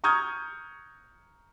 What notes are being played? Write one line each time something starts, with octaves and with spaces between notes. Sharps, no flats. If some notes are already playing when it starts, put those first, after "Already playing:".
A#5 C#6 D#6 F6 G6 G#6